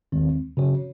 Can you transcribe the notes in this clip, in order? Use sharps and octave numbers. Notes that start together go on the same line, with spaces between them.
D#2 D#3 G#3 C4
C#3 F#3 C#4 F#4 C#5